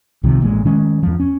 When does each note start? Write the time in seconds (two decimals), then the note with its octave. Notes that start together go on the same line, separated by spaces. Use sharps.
0.23 C2 C3 D#3 F3
0.40 A1 A#2 D#3 G#3
0.65 D#3 G#3 C#4
1.03 E2 F3
1.20 C#4